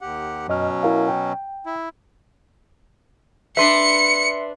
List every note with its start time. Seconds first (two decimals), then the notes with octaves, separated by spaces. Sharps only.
0.01 D#2 G4 F#5
0.48 F#2 B2 F#3 C#4 D#5 F6
0.83 E4 A#4 F5
1.08 G5
1.66 E4
3.57 D4 B4 E5 C6 C7 C#7